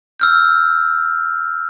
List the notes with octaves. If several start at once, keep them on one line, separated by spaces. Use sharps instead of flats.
E6 F6 G6